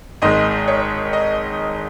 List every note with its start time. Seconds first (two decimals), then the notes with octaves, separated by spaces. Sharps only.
0.22 G#1 G#2 D#3 G#3 D#5
0.68 C#5
1.13 D#5